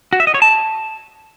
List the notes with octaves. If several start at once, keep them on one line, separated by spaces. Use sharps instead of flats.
F#4
E5
D#5
C#5
A5